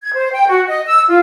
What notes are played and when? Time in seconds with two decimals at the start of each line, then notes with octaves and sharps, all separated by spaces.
0.02 G#6
0.14 C5
0.31 G5
0.47 F#4
0.68 D#5
0.86 E6
1.08 F4